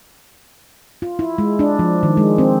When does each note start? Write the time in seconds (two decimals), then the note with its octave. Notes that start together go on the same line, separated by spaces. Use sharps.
1.02 F4
1.19 E4
1.38 G#3
1.59 D4
1.79 F3
2.03 D#3
2.17 G#3
2.38 C4